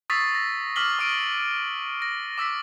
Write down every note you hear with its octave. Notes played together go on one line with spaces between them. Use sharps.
C#6 D#6 E6 A6 B6 C7
A#6
D6 F6 B6 F#7 G7
C#6 D#6 F6 D7 D#7
A#6
D6 E6 A#6 B6